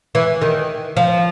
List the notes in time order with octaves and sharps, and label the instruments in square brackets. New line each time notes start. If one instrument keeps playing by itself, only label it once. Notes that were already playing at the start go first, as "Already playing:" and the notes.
[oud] E3
D#3
F3